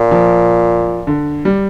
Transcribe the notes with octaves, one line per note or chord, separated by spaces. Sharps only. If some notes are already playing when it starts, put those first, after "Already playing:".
Already playing: A#2
F3
D3
G3